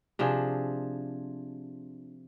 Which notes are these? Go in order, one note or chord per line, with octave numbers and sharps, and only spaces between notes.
C3 F3 D4 G#4